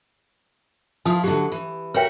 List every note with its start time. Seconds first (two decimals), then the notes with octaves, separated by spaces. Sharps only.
1.05 F3 E4 F4 A5 D#6
1.24 D3 F#3 G4
1.52 E3
1.94 F#4 A#4 B4 C#5 E5 G5